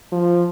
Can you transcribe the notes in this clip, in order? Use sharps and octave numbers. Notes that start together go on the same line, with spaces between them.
F3